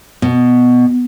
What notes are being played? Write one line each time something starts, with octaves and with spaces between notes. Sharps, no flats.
B2